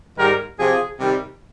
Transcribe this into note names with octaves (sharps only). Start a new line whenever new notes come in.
G#2 D#3 G3 A#4
C3 F3 G#4
C3 D#3 G3